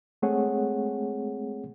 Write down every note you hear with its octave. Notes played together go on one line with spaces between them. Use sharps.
G#3 A3 C4 G#4 C#5 F#5